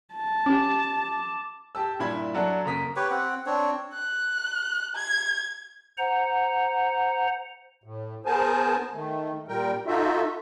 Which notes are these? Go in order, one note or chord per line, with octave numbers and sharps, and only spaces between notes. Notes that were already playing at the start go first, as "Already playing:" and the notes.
A5
C#4 G4 D6
G4 A5 E6
G2 A#2 E4 B5 G#6
F#3 D4 A4 F#5
F#1 A#3 A#5 D#6 B6
G4 B4 C#5
C4 F#5
C4 D4 C#5
F#6
G#6
C5 F#5 A#5
A2
B3 G#4 A#4 C5 G#5 A5
D#3 A3
A#2 G3 A#4 G5
D#4 F4 F#4 A4 E5